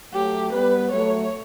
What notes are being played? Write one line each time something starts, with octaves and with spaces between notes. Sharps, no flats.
F#3 A3 G4
G3 B3 B4
F#3 A3 C#5